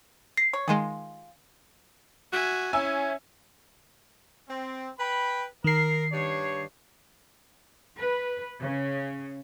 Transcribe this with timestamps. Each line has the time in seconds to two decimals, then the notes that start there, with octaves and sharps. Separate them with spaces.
0.37 A#6 C7
0.53 C#5
0.68 D#3 G#3 F4 G#4
2.33 F#4 E5 G#5
2.73 C#4 E4 C#5 E5 G#5 E6
4.49 C4
4.99 B4 G5 B5
5.64 D#3 A#4 C7
6.12 G2 D4 C#5
7.98 B4
8.59 C#3